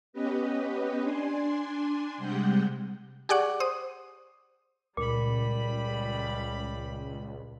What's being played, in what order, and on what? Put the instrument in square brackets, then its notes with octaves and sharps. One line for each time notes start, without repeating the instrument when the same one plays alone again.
[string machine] B3 C#4 G4 B4 D#5
D4 G#5 C6
C3 G3 G#3 F#5 G5 G6
[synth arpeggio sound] G4 G#4 D5 F#5 C#6 D6
C5 D#6
[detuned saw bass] C#2 [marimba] A#2 [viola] G3 B5